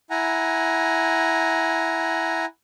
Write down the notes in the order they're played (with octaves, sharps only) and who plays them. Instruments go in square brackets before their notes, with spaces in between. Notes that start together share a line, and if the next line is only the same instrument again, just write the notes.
[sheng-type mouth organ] E4 F#5 G#5 A#5